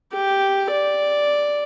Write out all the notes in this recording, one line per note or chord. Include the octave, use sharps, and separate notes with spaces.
G4
D5